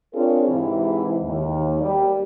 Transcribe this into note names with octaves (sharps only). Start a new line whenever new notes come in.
C4 D4 F4 G#4 A#4 C#5
G#2 C3 E3 E4
D#2
G3